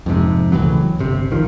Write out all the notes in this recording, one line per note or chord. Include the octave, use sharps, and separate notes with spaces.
F2 G#2 C3
C#2 A2 E3 F#3
G1 C3
B1 D#3 F3